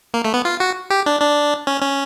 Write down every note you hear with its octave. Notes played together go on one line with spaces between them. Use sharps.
A#3
A3
B3
F4
F#4
G4
D4
D4
C#4
C#4